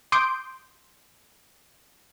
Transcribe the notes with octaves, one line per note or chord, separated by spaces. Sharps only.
C6 D6 D#6 G6 D7